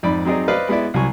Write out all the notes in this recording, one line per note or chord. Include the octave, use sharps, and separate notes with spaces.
F2 G#2 D5 B5
F#3 C4 D#4 G#4 D5
B4 C5 D5 D#5 F5
G#3 B3 E4 D5 E5
C2 F#3 G#5 C#6